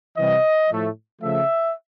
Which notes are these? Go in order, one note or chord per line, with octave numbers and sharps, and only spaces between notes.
C3 E3 G3 D#5
A2 F3 A3
C#3 F3 A3 E5